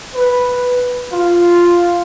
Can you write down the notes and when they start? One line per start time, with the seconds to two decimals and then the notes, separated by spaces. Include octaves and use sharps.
0.15 B4
1.12 F4